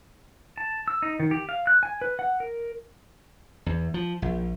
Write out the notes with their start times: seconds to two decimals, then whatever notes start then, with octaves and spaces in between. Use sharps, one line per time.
0.58 A5
0.88 E6
1.02 D#4
1.20 D#3
1.31 G4
1.49 F5
1.67 F#6
1.83 G#5
2.01 B4
2.19 F#5
2.40 A#4
3.66 E2
3.94 F3
4.22 A#1